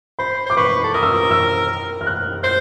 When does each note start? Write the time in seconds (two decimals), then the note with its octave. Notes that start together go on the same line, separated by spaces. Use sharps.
0.19 C5 B5
0.46 C5 D6
0.57 B4 C#6
0.84 A4
0.94 A#4 D#6
1.03 E6
1.12 D#6
1.31 E6
2.01 F6
2.06 F#6
2.43 C5 G6